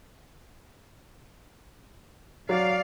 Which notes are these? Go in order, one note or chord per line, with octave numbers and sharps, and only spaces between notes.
F#3 D5 F5